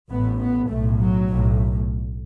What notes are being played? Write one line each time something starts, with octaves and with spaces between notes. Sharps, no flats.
A1 A2 B3
B3
B1 A2 A3
F#3
B1 A2